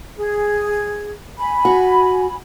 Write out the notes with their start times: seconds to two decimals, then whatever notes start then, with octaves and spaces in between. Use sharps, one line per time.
0.18 G#4
1.38 G#5 B5
1.65 F#4